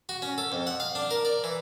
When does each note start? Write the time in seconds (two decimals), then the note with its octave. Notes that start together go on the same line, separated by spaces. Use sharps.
0.09 F#4
0.22 C#4
0.38 A4
0.52 F2
0.67 F#5
0.80 F5
0.95 D4
1.11 A#4
1.25 D5
1.44 E3